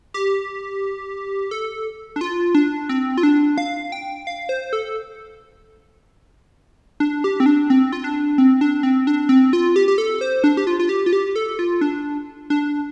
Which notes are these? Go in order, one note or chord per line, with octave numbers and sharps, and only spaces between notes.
G4
A4
D4
F4
D4
C4
F4
D4
F5
G5
F5
C5
A4
D4
G4
C4
D4
C4
F4
D4
C4
D4
C4
D4
C4
F4
G4
G4
A4
C5
D4
G4
F4
F4
G4
F4
G4
A4
F4
D4
D4